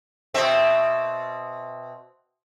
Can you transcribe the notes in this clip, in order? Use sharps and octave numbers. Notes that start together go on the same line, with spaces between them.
B2 C4 E5